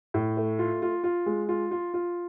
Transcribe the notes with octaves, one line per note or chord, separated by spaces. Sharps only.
A2
A3
F4
F4
F4
G#3
F4
F4
F4